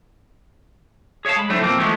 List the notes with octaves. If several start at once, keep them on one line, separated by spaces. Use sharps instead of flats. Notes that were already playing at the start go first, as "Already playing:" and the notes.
G#4 C#5 E5 F5 A5
G#3 B5
D3 F#3 A3 C4 E4 C5
B1 F3 A#3 C4
E3 F3 G#3 A3 B3